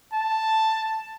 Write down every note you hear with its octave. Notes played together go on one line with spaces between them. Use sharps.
A5